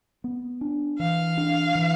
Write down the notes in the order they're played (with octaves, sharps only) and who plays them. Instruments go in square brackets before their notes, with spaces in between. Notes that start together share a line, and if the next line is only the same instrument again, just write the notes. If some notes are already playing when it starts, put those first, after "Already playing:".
[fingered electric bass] B3
D4
[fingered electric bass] E3 [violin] F5
[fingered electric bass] D4
E3